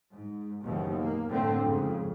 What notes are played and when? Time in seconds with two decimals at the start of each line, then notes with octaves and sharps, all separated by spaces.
0.14 G#2
0.66 F#1 D#2 B2 E3
0.99 A#3
1.30 A2 D3 A3 C4
1.63 F2 G#2 C#3